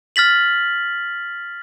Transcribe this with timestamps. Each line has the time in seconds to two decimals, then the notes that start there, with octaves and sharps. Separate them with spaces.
0.16 F6 A6 B6 F#7